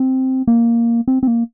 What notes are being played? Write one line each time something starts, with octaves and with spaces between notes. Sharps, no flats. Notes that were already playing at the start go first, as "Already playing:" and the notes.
Already playing: C4
A#3
C4
C4
A#3